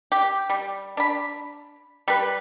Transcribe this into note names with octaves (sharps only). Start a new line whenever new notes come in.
G4
G3
D4 B5
G3 B4